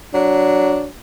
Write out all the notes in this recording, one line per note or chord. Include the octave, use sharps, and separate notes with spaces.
F#3 D4